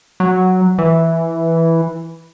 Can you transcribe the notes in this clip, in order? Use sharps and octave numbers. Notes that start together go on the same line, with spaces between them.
F#3
E3